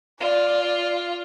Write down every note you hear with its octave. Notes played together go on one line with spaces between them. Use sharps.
F4 D5